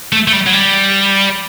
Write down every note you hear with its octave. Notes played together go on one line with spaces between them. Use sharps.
A3
A3
G3
F#3
G3